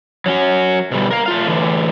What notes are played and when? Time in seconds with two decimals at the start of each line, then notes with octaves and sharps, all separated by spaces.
0.26 F#3 C#4 F#4
0.91 B2 D3 G3
1.11 A#4 F5
1.26 A3 F4 F5
1.46 A2 D3 E3